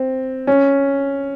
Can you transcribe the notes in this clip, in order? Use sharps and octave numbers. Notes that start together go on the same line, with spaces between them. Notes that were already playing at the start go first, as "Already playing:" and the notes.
Already playing: C4
C#4